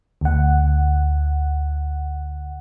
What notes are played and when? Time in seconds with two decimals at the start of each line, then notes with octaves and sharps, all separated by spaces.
0.21 D2 F#5